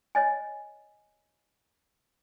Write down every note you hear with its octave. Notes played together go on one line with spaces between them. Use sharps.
C#5 D#5 G#5